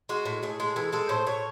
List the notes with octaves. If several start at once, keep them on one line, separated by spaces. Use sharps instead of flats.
G#3 F#4
A2
A2 G#4
G#3
E3 A4
G#3 A4
A2 C5
A2 C#5